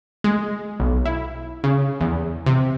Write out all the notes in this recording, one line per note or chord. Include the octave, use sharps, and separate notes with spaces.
G#3
B1
E4
C#3
E2
C3